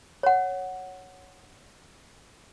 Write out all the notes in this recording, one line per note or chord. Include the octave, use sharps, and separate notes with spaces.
C#5 F#5